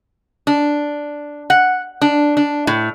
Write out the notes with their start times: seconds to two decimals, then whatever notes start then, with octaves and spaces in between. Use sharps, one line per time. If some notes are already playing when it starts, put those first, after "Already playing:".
0.47 D4
1.50 F#5
2.02 D4
2.37 D4
2.67 A2